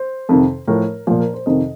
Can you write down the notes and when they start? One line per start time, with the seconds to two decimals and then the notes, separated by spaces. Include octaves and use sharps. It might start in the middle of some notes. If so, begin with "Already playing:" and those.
Already playing: C5
0.29 F2 C3 D#3
0.67 A2 F3 A#4
1.07 A#2 F3 C5
1.20 A#4
1.33 C5
1.46 F2 C3 D#3 D#5